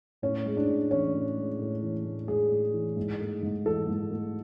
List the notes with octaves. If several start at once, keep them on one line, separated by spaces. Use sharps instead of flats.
A2 C#4
G#3
D4
A2
E3 C#4
A2
G#3
A2
E3
A2
G#3 G#4
A2
E3
G#2
A3
G#2
E3 A4
G#2
A3